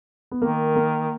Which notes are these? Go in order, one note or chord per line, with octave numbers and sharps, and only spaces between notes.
B3
D#3 A#3
A#3